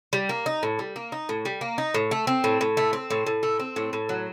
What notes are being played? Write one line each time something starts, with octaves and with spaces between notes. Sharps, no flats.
G3
A#3
D#4
A2
G3
A#3
D#4
A2
G3
A#3
D#4
A2
A3
C4
A2
A2
A3
C4
A2
A2
A3
C4
A2
A2
F#3